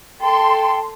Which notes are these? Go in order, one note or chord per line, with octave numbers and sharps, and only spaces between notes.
A4 G5 C6